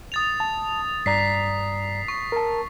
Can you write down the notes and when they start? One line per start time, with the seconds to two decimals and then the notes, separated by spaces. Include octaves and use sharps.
0.12 D#6 A6 F7
0.40 A5
1.06 G2 D5 A#5 B6 C7
2.08 C#6
2.32 A#4 A5